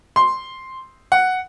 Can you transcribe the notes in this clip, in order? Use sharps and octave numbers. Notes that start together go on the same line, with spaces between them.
C6
F#5